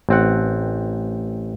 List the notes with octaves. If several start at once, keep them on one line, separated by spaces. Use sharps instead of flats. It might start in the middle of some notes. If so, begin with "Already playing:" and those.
A1 C4 F#5